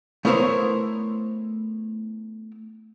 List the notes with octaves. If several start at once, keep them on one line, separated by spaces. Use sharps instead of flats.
A3 B3 E4 A#4 C5 C#5